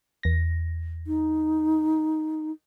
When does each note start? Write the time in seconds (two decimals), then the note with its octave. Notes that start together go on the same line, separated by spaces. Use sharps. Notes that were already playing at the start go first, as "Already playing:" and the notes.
0.23 E2 A#6
1.07 D#4